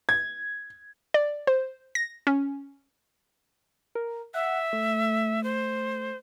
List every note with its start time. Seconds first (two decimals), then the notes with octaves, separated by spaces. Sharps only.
0.09 G#6
1.14 D5
1.47 C5
1.95 A#6
2.27 C#4
3.95 A#4
4.34 E5 F#5
4.73 A3
5.44 C5